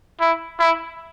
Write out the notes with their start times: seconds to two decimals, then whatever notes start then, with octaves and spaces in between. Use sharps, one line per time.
0.20 E4
0.59 E4